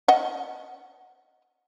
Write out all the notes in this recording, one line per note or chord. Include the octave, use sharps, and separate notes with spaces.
D#5 F#5